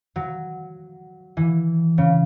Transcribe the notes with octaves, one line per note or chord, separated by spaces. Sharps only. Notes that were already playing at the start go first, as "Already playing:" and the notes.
F#3
E3
C#3